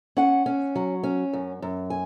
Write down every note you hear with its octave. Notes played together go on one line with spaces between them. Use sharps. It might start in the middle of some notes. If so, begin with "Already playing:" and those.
C#4 F#5
C#4
F#3
C#4
F#2
F#2
G#5